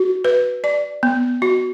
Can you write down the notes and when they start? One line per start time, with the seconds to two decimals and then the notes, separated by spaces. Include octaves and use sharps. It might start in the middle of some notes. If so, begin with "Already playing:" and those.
Already playing: F#4
0.25 B4
0.64 D5
1.03 B3
1.42 F#4